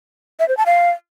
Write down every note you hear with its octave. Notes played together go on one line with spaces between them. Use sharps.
E5
C5
A5
F5